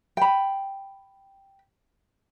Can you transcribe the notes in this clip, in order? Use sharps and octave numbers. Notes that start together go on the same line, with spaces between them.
G5 B5